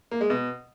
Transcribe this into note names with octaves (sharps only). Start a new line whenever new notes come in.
A#3
G#3
B2